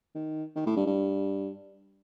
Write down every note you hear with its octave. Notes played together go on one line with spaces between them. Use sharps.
D#3
D#3
A2
G2
G2